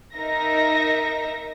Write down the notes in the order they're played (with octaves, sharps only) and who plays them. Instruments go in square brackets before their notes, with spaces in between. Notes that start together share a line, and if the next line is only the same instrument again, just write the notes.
[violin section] D#4 A#4 E5 A#6